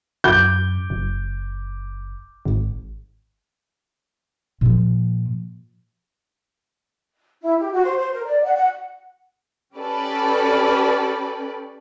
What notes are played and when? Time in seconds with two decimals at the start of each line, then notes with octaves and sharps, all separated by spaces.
0.24 F#2 D6 G6
0.90 F#1
2.45 G#1
4.61 A#2 F3
7.43 E4
7.59 G4
7.72 F#4
7.84 C5
7.98 C5
8.13 A#4
8.26 D5
8.43 F#5
8.56 F#5
9.76 C#4 G4 A4 B4 D5